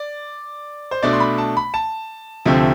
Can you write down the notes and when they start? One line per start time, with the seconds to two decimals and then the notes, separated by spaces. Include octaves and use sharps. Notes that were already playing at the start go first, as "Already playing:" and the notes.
Already playing: D5
0.91 C5
1.03 B2 A3 D4 D5
1.13 C6
1.20 B5
1.38 A5
1.57 B5
1.74 A5
2.46 D2 C3 F3 A3 C4